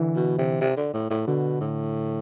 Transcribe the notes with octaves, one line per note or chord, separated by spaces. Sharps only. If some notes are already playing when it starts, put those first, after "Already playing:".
Already playing: D3 E3
B2
C3
C3
D3
A2
A2
B2 D3
A2